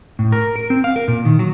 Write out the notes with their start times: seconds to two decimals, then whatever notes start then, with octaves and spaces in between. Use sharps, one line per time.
0.19 A2
0.32 A#4
0.56 A#4
0.70 C4
0.84 F5
0.96 A#4
1.08 A#2
1.25 D#3
1.39 F#3